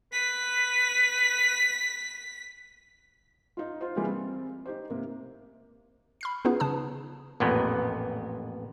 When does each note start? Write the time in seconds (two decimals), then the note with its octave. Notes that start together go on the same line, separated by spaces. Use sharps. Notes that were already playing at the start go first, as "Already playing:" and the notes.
0.13 B4 B6
3.57 D#4 F4
3.81 F4 C5
3.96 C3 E3 G3 G#3 A#3 F4
4.08 C4
4.66 D#4 G4 C5
4.90 C3 A#3
6.21 B5 F6 C7
6.45 B3 C#4 D#4 F4 G#4 B4
6.60 C#3 B4 A5 D#6
7.40 A1 F2 A#2 B3